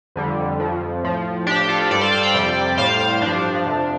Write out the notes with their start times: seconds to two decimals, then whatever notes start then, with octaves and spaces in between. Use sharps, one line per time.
0.16 F2 D3 G3
0.60 F2 F3
1.03 A2 F3
1.47 A2 F3 D4 G4
1.69 F4 A4
1.91 G2 G3 A4 D5
2.01 C5 F5
2.12 C5 F5
2.23 D5 G5
2.34 F2 C3 G3
2.77 A2 G3 C5 F5
3.22 G2 F3 D4
3.65 F2 C3 F3